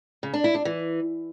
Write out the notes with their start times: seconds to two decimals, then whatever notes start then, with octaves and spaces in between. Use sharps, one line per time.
0.23 C#3
0.34 D4
0.44 E4
0.55 D4
0.65 E3